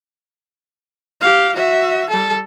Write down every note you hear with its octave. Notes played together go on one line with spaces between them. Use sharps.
G4 F5
F#4 E5
G3 A4